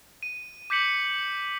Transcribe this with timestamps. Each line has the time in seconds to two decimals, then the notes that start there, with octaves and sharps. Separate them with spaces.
0.23 D#7
0.70 D6 G6 B6 C#7 F#7